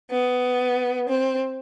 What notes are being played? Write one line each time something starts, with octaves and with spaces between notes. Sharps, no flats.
B3
C4